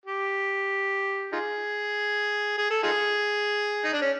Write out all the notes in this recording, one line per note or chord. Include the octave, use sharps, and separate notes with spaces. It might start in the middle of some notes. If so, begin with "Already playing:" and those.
G4
D#4 F4 G#4
G#4
A4
D#4 F4 G#4
D#4
D4
C#4